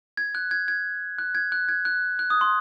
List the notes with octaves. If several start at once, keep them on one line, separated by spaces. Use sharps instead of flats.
G#6
F#6
G#6
G#6
F#6
G#6
F#6
G#6
F#6
F#6
D#6
C6